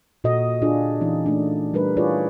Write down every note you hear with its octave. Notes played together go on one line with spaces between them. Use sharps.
A#2 F#4 A4 D#5
D4 F4 G#4
E3 C#4 D#4
A3 D4
G3 D4 A#4 B4
E4 F4 G#4 B4 C#5 D5